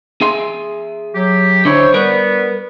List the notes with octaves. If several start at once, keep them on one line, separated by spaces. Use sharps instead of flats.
G#4 E5 C6
F#3 G4
D3 E4 C5 C#5
G3 B3 A#4 B4